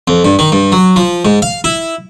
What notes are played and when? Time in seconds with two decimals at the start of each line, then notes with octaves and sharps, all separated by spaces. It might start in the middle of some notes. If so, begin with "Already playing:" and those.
0.08 F2
0.24 G2
0.39 D#3
0.52 G2
0.72 F#3
0.96 F3
1.25 G#2
1.42 F5
1.64 E4